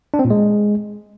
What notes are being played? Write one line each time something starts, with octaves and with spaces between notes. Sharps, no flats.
D4
C4
A#2
G#3